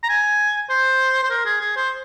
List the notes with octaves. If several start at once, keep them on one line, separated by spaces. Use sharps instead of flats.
A#5
G#5
C5
C5
A#4
G#4
G#4
C5